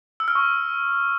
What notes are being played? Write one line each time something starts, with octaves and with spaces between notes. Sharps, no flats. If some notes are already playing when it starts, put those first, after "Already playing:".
E6
F6
C#6